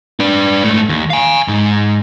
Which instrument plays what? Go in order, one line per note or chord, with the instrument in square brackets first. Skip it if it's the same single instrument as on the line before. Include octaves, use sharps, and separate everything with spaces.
[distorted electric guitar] D4 B4
G#2 A3
D#2
F5 G#5
G#2